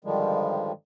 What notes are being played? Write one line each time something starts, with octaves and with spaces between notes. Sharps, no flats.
G2 D3 D#3 F3 G3 G#3